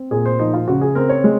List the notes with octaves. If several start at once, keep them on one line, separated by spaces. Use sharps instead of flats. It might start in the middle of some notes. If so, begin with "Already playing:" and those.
Already playing: C4
A#2 G#4
C5
F3 D#4
F4
C#3 F#4
G#4
C4 A#4
C#5
G#3